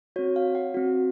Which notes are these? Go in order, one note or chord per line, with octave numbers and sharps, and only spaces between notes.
C4 F#4 C#5
F5
F#5
C4 F#4